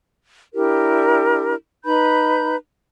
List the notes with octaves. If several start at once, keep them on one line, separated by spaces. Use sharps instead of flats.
D4 E4 G4 A#4
D#4 B4 B5 G6